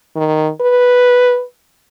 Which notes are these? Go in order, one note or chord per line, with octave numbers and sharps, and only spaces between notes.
D#3
B4